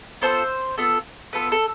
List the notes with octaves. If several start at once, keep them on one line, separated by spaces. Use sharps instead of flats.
B3 F4 A4 C5
B3 F4 A4
B3 F4 A4 B4
A4